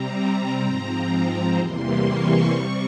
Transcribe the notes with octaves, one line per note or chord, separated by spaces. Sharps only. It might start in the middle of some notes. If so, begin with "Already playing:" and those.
Already playing: C3 G3 C4 A#5
G#2 F3 C4
E2 C3 E3 G3 A#3 C6
C#6
C3 G3 C4